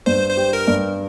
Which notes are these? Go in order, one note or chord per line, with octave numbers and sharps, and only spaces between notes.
G2 C5
C5
G4
A#4
G2